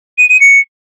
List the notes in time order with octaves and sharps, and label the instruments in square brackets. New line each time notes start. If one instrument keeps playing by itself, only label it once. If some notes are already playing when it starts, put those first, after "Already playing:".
[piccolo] D#7
D#7
C#7